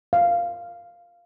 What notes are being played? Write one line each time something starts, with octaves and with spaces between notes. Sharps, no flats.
F5